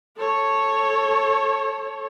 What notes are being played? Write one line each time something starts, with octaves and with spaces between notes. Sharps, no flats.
A4 C#5